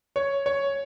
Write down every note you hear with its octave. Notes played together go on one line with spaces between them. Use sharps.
C#5
C#5